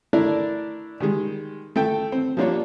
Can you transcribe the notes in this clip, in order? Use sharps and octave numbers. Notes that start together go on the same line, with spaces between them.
A3 D4 E4 A#4 D5
D#3 G3 G#3
A3 A4 G5
C4
F3 G3 A#3 D4 F4 C#5